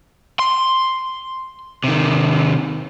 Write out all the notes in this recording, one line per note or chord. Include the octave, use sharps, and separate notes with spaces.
C6
C3 D#3